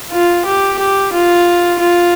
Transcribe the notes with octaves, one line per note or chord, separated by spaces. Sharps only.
F4
G4
G4
F4
F4